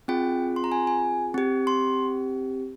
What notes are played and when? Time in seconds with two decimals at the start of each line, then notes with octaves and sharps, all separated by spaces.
0.08 C4 F4 G#4 G5
0.56 C6
0.64 A#5
0.72 G#5
0.87 G#5
1.34 C4 G4
1.67 C6